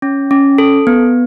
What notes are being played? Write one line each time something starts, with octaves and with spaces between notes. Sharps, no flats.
C#4
C#4
A4
B3